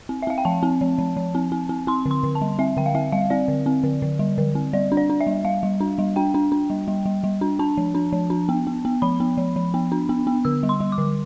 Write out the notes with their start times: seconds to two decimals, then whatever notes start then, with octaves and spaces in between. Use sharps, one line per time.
0.09 C4
0.22 E5
0.27 C4 F5
0.38 G5
0.45 F3 A5
0.63 C4
0.81 F3
0.99 F3
1.17 F3
1.35 C4
1.52 C4
1.69 C4
1.87 C4 C6
2.06 D3
2.11 C6
2.24 D3
2.35 A5
2.41 G3
2.59 C4 E5
2.77 D3 G5
2.86 F5
2.95 C4 E5
3.12 G3 F5
3.30 C4 D5
3.48 D3
3.66 C4
3.84 D3
4.02 D3
4.19 G3
4.38 D3
4.55 C4
4.73 G3 D5
4.92 D4
4.97 D5
5.10 D4
5.21 E5
5.27 G3
5.44 G3 F5
5.63 G3
5.81 D4
5.98 G3
6.16 D4 G5
6.34 D4
6.52 D4
6.70 G3
6.88 G3
7.06 G3
7.24 G3
7.41 D4
7.59 D4 A5
7.78 F3
7.95 D4
8.12 F3
8.30 D4
8.49 B3
8.67 B3
8.85 B3
9.02 F3 B5
9.20 B3
9.37 F3
9.56 F3
9.74 B3
9.92 D4
10.09 B3
10.27 B3
10.45 D3 E6
10.63 G3
10.69 C6
10.80 G3
10.92 D6
10.98 D3